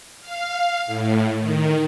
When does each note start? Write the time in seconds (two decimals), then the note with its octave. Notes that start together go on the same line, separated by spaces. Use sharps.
0.21 F5
0.87 A2
1.38 D#3